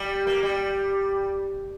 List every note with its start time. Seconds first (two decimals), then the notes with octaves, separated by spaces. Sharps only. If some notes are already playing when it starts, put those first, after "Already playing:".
Already playing: G3
0.27 A#3
0.43 G3